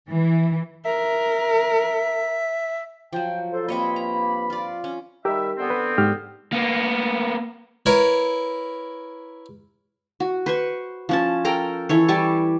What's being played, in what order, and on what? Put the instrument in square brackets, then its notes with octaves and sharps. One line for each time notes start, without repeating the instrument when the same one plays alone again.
[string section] E3
[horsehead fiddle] A#4 [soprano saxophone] E5
[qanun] F3 F#3 [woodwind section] G5
[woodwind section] F4 A4 C5
[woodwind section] G2 A#3 B5 [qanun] C4 C#5 D#5
[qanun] A#5
F4 D5
C#4
[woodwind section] D#3 G3 E5 [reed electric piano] G4 A#4
[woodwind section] D3 B3 C4
[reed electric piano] B4
G#2 G4 F6
[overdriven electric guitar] A#3 B3
[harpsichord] E4 A#4 B4 C#5
[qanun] F#4
B4 C5 C#6
F3 C#4 A5
A4 A#4 G5 A#5
E3 A4 C#5
G3 G4 A5 C#6